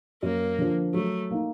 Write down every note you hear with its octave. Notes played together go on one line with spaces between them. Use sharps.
F#2 A#3
D3 F3
F#3 A3
A#3 D#4